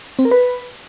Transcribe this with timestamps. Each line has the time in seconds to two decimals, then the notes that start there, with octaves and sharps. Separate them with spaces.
0.19 C4
0.25 A#4
0.31 B4